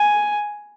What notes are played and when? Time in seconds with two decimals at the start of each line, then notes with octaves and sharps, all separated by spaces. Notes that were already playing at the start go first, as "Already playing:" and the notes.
Already playing: G#5